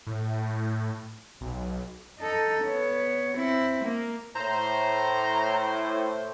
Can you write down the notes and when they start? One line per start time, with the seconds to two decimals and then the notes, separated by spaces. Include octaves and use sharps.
0.07 A2
1.41 B1
2.19 D#4 A4
2.63 B3 C#5
3.34 C4 E4
3.84 A#3
4.36 A2 C5 A#5